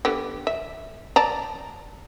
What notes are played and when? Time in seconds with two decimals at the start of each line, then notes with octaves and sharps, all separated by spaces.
0.05 D3 B3 G4
0.47 E5
1.16 D5 A5 A#5